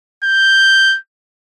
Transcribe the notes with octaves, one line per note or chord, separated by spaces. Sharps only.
G6